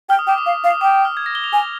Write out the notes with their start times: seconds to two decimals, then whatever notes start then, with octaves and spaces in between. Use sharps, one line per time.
0.09 G5 F6
0.19 D#6
0.27 G5 D6
0.38 D#6
0.46 F5
0.64 F5
0.71 D#6
0.81 G5 D6
1.05 F6
1.17 G#6
1.26 A#6
1.35 G7
1.44 F7
1.53 G#5